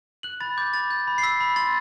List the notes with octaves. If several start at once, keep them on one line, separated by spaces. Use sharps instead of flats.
F#6 F#7
B5 A6
D6 G6
B5 A6
G6
B5
C7
E6 B6
B5
C6 A6